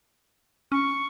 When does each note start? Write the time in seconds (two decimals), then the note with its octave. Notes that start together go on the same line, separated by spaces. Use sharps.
0.72 C#4 C#6